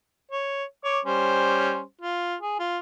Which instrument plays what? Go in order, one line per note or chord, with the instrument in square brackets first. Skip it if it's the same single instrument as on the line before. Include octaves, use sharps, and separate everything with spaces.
[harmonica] C#5
C#5 D6
G3 C#4 C5
F4
G#4
F4